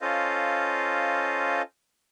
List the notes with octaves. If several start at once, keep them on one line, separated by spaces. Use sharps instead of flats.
C#4 F4 A4 C5 D#5 F5